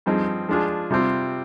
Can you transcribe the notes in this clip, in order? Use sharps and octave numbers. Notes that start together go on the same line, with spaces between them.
G2 F3 C4 D#4 G#4
F3 G#3 D4 F4 G#4
C3 G3 C4 F4